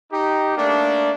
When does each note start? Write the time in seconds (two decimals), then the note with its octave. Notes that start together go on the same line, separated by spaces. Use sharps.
0.12 D#4 G4
0.56 A3 A#3 D4